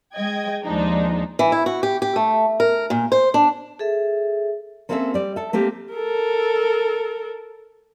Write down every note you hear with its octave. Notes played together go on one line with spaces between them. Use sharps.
G#3 D#5 G5 G#6
D#2 F3 G#3 D4 D#4
E3
E4
F#4
G4
G4
A3
A#4
A#2
C5
D4
G#4 A4 E5
A#3 C4 C#4 G#4 A4 E5
G3 D5
A4 E5
A3 A#3 C4 G4 A#4
A4 A#4